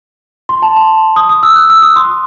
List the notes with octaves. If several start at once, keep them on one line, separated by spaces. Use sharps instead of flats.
C6
A5
C6
D#6
D#6
E6
F#6
E6
D#6
C6